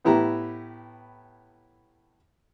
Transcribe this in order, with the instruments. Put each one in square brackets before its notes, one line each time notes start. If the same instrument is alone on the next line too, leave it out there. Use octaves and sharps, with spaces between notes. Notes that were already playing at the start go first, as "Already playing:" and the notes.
[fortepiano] A2 B3 E4 G4 A#5